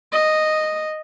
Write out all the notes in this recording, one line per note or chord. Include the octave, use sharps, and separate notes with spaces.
D#5